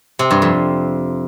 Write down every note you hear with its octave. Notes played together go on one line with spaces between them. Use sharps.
C3
G2
F2